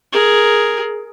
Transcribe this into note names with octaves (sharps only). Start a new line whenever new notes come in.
G#4 A#4